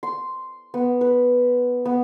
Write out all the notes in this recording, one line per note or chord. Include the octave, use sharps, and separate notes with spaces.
C6
B3
B4
B3